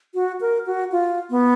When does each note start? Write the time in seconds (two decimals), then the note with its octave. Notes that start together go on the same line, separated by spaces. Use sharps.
0.14 F#4
0.41 A#4
0.66 F#4
0.92 F4
1.30 B3